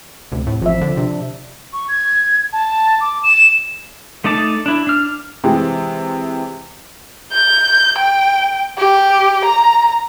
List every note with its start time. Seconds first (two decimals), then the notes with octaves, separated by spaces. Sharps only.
0.32 D2 C3
0.47 A2
0.62 A1 F3 E5
0.81 D3
0.97 C3 D4
1.73 C#6
1.88 G#6
2.53 A5
3.01 D6
3.23 E7
4.24 A3 D#4 D5 A5
4.66 D4 E4
4.87 D4 F6
5.44 C3 E3 G#3 C4 G#4
7.33 G6
7.98 G5
8.78 G4
9.45 A#5